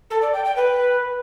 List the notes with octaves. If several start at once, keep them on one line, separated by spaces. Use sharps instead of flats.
A4
D5
G5
G5
B4